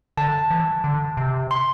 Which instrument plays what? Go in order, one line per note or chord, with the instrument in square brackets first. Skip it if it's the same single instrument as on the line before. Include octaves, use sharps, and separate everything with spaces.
[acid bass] D3 [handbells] A5
[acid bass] E3
D3
C3
[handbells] C6